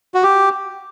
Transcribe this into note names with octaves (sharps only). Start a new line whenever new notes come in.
F#4
G4